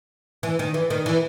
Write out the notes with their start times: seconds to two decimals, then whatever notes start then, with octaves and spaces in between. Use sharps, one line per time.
0.43 E3
0.59 D#3
0.74 E3
0.90 D#3
1.06 E3